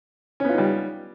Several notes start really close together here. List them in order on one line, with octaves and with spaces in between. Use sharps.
C#4 B3 F4 D#4 G3